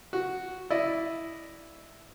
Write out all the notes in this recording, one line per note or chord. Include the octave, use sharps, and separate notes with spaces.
F#4
E4 D5 D#5